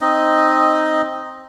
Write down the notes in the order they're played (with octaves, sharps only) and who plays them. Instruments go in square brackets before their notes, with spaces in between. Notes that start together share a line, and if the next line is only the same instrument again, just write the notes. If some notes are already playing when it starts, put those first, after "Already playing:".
[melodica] C4 D#4 D#5